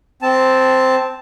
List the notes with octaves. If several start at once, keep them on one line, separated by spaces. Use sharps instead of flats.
C4 A5